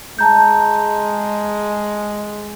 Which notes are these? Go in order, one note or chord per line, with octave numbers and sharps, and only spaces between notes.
G#3 A5 A#5 G6